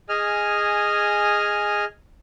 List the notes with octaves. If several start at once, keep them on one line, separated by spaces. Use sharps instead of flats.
G#4 D#5 G#5 F6